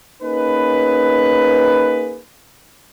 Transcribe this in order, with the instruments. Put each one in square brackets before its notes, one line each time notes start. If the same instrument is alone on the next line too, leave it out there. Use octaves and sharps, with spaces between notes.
[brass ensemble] A#3 C#4 D#4 G#4 B4